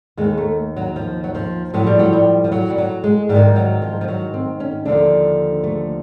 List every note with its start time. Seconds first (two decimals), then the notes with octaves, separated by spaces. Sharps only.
0.17 D#2 D#3 G#3
0.37 A3
0.76 F#3
0.96 F3
1.24 F#3
1.35 F3
1.74 A2 F3 F#3
1.87 G3
1.99 F#3
2.13 G3
2.44 F3
2.52 F#3
2.70 G3
2.78 F#3
3.04 G#3
3.29 G#2 D#3 G3
3.56 F#3
3.82 F3
4.01 F3
4.08 F#3
4.34 C4
4.60 C#4
4.85 D#2 D3 F3 D4
5.64 A3